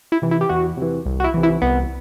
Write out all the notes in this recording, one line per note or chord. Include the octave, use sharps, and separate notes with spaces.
E4
C3 E3
E4
G4
E2 F#4
C3 E3
C2
F#4
E4
C3 E3
E4
C2 B3